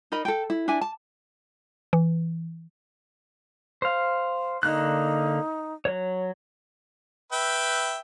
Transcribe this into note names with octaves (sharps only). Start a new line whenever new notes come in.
D#4 A#4 D#5 B5
A4 G5
E4
D4 E4 E5 G#5
A5
E3
C5 F5
D3 A#3 D#4 F#6
F#3 C#5
B4 E5 G5